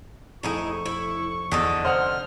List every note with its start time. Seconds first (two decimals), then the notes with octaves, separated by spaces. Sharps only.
0.43 F1 A3 D#4 E4 G#4 C#6 D#7
0.86 E4
1.52 E2 D3 D#4 A4 A5 D#6 A#6
1.85 C3 C5 F#5 D#6 F6